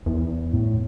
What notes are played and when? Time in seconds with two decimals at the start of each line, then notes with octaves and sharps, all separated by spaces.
0.06 E2
0.53 A2